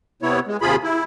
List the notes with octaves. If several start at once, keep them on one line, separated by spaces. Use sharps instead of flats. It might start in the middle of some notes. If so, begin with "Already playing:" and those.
C3 B3 E4 C#5
G#3
D#2 C3 F4 G#4 B5
E4